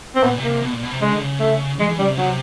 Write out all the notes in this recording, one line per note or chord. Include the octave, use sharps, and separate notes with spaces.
C4
A#2 B3
C3
A#3
C3
B2
A#2
B2
C3
C#3 G#3
D3
C#3
A3
E3 G#3
E3
C#3 G3
C3
C#3 F#3
C3